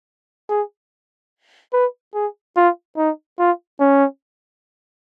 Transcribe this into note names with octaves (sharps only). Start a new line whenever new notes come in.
G#4
B4
G#4
F4
D#4
F4
C#4